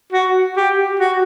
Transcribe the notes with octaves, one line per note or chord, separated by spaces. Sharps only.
F#4
G4
F#4